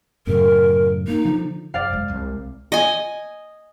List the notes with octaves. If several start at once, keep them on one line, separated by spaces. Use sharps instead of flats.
F#2 A2 C#3 A#4
A#3 D#4
D3 F3
F#2 C3 D5 F5
F2 G#3
C2 G#3
D#5 G#5